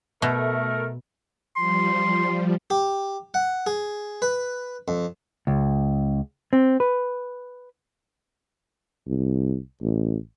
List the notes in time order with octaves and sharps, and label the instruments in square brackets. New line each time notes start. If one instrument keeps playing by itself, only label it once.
[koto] B2 [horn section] A3 A#4
[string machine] F3 G3 [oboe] C6
[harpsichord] G4
F#5
G#4
B4
F2
[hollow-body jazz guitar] C#2
C4
B4
[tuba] C2
A1